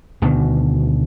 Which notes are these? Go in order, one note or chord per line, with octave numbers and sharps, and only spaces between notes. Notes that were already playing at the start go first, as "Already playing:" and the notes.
D2 B2 D#3